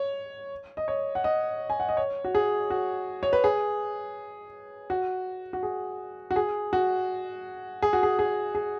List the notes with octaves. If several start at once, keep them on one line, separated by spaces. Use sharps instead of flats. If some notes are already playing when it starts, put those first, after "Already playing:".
Already playing: C#5
D#5
C#5
F#5
D#5
G#5
F#5
D#5
C#5
F#4
G#4
F#4
C#5
B4
G#4
F#4
F#4
G#4
F#4
G#4
F#4
G#4
F#4
G#4
G#4
G#4